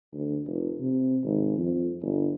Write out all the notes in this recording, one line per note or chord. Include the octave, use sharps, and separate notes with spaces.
D2
F1
C3
G#1
F2
G1